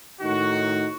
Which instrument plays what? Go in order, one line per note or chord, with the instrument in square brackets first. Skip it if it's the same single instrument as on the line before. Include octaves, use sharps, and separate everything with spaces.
[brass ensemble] A2 D#3 D#4 F#4